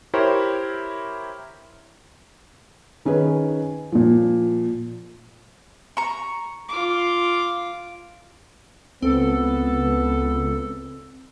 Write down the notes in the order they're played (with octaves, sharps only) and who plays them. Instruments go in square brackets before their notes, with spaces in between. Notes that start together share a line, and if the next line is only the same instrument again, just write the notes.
[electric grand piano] E4 G4 A#4 C5 C#5
[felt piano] D#3 C#4 G#4 B4
A#2 F3
[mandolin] A#5 C#6
[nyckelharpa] F4 D6
[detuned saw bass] C#2 [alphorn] B3 [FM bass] C4 [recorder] A4